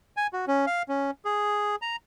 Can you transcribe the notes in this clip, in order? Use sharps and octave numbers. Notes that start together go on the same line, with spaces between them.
G#5
F#4
C#4
F5
C#4
G#4
A#5